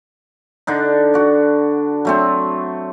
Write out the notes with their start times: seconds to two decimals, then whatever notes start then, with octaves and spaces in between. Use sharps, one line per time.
0.67 D3 D4 D#4
1.14 F#4 D5
2.05 F#3 A3 C4